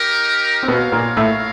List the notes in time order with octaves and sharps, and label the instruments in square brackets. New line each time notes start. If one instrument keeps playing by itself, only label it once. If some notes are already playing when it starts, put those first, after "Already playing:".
Already playing: [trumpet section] D#4 G4 A#4
[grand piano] C4
[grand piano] B2 B3 [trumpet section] F4 A#4 C#5 F5
[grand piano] A#2 A#3
A2 A3